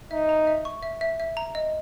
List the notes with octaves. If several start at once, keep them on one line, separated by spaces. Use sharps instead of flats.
D#4 E5
A#5
E5
C#6
E5
E5
E5
A#5
D#5